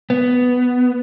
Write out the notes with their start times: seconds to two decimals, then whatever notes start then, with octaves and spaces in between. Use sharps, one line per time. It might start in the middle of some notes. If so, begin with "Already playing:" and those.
0.10 B3